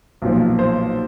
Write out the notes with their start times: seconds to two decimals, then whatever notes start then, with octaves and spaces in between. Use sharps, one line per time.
0.22 B1 A#2 F3
0.59 C5